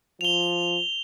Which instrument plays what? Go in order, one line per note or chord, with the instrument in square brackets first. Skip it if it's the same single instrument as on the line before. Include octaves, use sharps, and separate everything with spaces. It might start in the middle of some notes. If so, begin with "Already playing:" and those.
[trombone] F3 [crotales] F7 G7